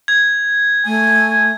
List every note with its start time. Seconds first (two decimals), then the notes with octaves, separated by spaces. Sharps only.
0.08 G#6
0.86 A3 G#5